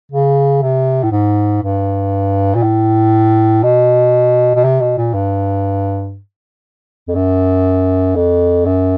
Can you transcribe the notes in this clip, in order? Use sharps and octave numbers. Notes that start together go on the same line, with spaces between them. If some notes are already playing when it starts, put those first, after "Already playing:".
C#3
C3
A2
G#2
G2
A#2
A2
B2
B2
C3
B2
A#2
G2
F2
F#2
F2
F#2